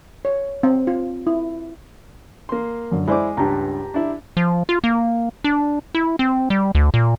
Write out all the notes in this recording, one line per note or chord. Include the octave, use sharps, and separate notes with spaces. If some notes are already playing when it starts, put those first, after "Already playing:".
C#5
C4
F4
E4
A#3 C6
F#2 D3
G#3 E4 G#4 C5 D5 D6
C#2 G2 G4 A5 A#5
D4 E4
F3
F4
A#3
D4
E4
C4
G3
D2
A#2